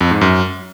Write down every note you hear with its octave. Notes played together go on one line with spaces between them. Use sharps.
F2
G#2
F#2